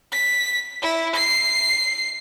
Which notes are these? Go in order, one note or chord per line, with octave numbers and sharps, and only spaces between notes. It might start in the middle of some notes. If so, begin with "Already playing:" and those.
B6
E4
C7